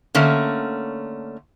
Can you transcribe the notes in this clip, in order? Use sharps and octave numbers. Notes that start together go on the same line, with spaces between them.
D3 A3 A#3 C#4